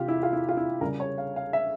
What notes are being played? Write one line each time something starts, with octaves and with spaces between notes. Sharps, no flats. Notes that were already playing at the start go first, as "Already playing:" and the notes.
Already playing: C3 E3 F4 G4
E4
F4
E4
F4
E4
C#3 G3 A#4
C#5
F5
F5
E5